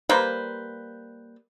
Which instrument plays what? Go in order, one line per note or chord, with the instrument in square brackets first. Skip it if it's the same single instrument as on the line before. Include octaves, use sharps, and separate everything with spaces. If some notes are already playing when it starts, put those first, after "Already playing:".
[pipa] G3 A#3 B4 C5